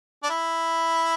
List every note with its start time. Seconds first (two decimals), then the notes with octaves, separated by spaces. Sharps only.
0.23 D4
0.30 E4